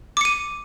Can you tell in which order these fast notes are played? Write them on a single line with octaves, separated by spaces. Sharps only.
D6 C#7 D#7